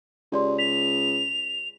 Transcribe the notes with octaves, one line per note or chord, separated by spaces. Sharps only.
C#2 G4 D5 C6
B6 F7